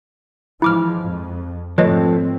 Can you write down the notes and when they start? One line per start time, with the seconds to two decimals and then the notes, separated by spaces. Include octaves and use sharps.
0.62 E3 F3 G#3 E4 D6 F6
1.01 F2
1.78 G#2 F3 A3 C4 B4 C#5 D#5